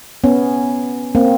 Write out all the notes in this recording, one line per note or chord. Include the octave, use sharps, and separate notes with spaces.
B3 C#4
A#3 C4